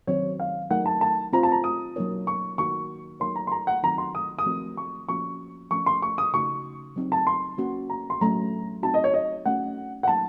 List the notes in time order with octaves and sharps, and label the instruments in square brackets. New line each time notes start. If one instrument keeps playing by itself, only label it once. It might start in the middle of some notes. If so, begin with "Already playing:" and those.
[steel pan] D#3 F#3 C4 F#4 C5 [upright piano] C#5
[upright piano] F5
[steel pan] F#3 A3 D#4 A#4 [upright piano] F#5
[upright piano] A5
A5
[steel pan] C4 F4 C5 [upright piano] A#5
[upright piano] A5
A#5
D#6
[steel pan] F#3 A#3 D#4 A#4 C#5
[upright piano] C#6
[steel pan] D#3 A#3 D#4 F#4 A#4 [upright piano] C#6
[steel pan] F#3 A#3 D#4 A#4 C#5 [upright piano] C6
[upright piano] A#5
C6
A#5
F#5
[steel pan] D#3 F#3 C4 D#4 F#4 [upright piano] A#5
[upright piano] C6
D#6
D#6
[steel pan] F3 A3 C4 F#4 A#4
[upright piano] C#6
[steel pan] F3 A#3 C#4 F#4 [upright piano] C#6
[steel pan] F3 A3 C#4 [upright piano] C#6
[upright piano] C6
C#6
D#6
[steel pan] C#3 A3 D#4 F#4 [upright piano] C#6
[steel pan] F#3 C4 D#4
[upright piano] A5
C6
[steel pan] A#3 C#4 F#4
[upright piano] A#5
C6
[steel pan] F#3 A3 C#4 [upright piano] A#5
[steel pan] C4 D#4 F#4 [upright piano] A5
[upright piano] D#5
C#5
D#5
[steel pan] A3 C#4 F#4 [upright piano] F#5
[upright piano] F#5
[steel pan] F#3 A#3 D#4 [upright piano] A5